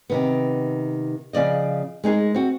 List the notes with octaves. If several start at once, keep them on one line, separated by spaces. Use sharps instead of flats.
C3 D#3 B3
C#3 F3 D5 D#5
G#3 D#4 G#4 A#4
C4 F#4